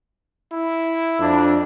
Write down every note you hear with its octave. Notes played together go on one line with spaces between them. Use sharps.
E4
F2 D4